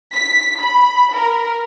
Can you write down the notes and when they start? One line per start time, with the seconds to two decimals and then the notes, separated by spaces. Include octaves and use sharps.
0.13 B6
0.62 B5
1.15 A#4